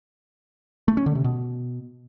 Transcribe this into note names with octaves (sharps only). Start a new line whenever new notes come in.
A3
C#4
D3
C3
B2